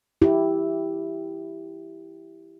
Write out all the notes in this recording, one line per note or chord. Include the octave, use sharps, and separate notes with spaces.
E4 G4